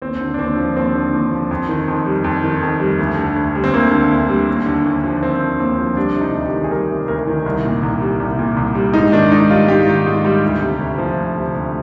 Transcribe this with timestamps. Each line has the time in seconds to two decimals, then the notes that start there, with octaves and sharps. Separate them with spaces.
0.02 D#2 C4
0.21 D3
0.34 D4
0.39 D#2 C4
0.57 F3
0.76 D#2 C4
0.95 D3
1.13 D#2
1.31 F3
1.51 F2
1.69 D#3
1.88 F2
2.06 G3
2.24 F2
2.43 D#3
2.62 F2
2.80 G3
2.99 D2
3.18 D3
3.36 D2
3.55 G3
3.64 C4
3.74 D2 A#3
3.91 D3
4.11 D2
4.29 G3
4.48 D#2
4.66 D3
4.85 D#2
5.04 F3
5.22 D#2 C4
5.41 D3
5.59 D#2 C4
5.78 F3
5.96 G3 D4
6.15 C3
6.21 D#4
6.34 D2
6.46 G4
6.52 D#3
6.64 G#4
6.71 G3 A#4
6.90 C3
7.08 D2 A#4
7.27 D#3
7.46 C2
7.65 A#2
7.83 C2
8.01 G3
8.20 C2
8.39 A#2
8.57 C2
8.75 G3
8.93 G#2 D#4
9.12 D#3 D4
9.32 G#2 D#4
9.50 G3 F4
9.68 G#2 G4
9.87 D#3
10.06 G#2
10.25 G3
10.43 D2
10.62 C3
10.79 D2
10.98 F3
11.17 D2
11.36 C3
11.55 D2